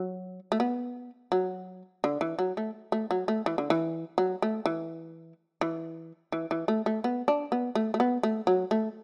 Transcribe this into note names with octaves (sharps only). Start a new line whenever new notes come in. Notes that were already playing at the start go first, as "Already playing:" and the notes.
Already playing: F#3
A3
B3
F#3
D3
E3
F#3
A3
A3
F#3
A3
E3
D3
E3
F#3
A3
E3
E3
E3
E3
A3
A3
B3
D4
B3
A3
A3
B3
A3
F#3
A3